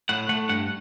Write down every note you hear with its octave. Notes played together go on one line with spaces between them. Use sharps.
A2 F#5
A3 F#5
G2 F#5